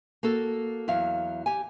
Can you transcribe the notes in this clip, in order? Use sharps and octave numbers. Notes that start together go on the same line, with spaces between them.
A#3 F#4 A4
E2 F#3 F5
G4 G#5